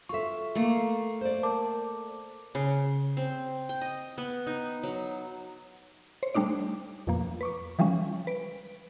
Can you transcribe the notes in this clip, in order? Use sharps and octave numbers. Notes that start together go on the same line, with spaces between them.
F4 A4 E5 C#6
A3 A#3
C5 D5
A#4 A5 D6
C#3
C4
G5
D#5
B3
D#4
F#3
C5 C#5
G3 A3 D4 D#4 D5
F2 B2 F3 A#3
B4 C#6 D6
E3 F3 G3 G#3 C#4
B4 D7